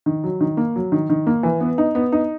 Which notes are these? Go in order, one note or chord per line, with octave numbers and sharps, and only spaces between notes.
D#3
F#3
D#3
A#3
F#3
D#3
D#3
A#3
E3
B3
D#4
B3
D#4